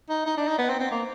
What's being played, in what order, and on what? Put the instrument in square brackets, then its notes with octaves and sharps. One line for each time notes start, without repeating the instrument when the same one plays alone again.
[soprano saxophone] D#4
D#4
D4
D#4
B3
C4
C4
A#3